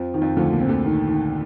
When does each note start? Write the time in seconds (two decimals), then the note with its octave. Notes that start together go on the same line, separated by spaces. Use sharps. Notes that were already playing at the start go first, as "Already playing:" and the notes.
Already playing: F2 F3
0.14 D#3
0.21 F2 F3
0.37 D2 D3 F3
0.52 A#2
0.60 C4
0.68 D2 D3
0.85 D#3
1.08 D#3